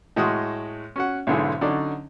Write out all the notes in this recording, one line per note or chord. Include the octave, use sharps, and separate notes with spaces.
A2 G#3 F#4 C6 D#6
C#4 F#4 F#5
B1 G#2 D3 E4 G#4
D3 F#3 C#4 D#4 D5